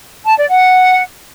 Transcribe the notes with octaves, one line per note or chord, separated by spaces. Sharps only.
A5
D5
F#5